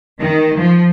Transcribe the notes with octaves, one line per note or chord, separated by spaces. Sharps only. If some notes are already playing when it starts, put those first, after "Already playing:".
D#3
F3